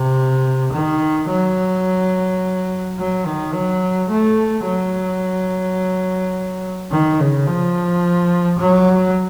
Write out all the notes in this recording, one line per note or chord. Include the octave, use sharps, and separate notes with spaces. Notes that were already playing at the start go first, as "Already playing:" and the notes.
Already playing: C3
D#3
F#3
F#3
D#3
F#3
A3
F#3
D#3
C#3
F3
F#3